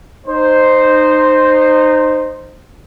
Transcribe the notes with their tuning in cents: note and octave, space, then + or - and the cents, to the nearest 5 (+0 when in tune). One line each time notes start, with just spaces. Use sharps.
D#4 -20 C5 +0